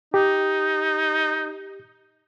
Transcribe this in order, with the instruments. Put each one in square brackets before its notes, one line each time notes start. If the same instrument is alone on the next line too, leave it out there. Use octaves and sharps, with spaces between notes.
[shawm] D#4 [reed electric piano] G4